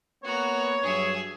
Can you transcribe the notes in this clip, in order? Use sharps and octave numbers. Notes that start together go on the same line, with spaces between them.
A#3 B3 F#4 B4 C#5 A#5
G2 F#3 G#4 E5